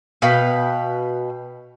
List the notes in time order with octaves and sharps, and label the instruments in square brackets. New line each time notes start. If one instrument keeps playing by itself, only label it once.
[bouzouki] B2 B4 F5 G5